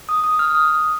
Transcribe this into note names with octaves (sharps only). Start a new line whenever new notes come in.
D#6
D#6
F6
D#6